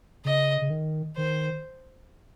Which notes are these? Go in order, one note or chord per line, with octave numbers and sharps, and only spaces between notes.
C#3 D#5
C#3
D#3
D#3 C5